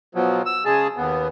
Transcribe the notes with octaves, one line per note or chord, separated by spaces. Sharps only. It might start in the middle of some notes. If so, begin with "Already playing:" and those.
B2 F3 F#3
E6
C#3 G#3 G#4 A5
D#2 B3